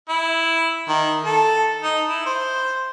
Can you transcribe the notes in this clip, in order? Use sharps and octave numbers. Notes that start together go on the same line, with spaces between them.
E4
D#3
A4
D#4
E4
C5